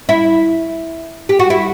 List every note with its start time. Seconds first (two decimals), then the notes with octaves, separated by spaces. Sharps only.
0.09 E4
1.29 G4
1.39 F#4
1.50 E4